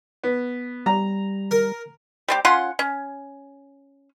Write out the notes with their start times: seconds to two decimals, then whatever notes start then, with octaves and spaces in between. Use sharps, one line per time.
0.24 B3
0.86 G3 A#5
1.51 A#4
2.28 G3 C4 G4
2.45 C#4 F4 F#5 C6
2.79 C#4